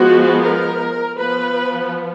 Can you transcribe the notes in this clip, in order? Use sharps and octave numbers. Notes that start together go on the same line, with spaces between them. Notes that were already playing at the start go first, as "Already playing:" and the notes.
Already playing: F3 G#3 B3 F#4
A#4
F3 B3 B4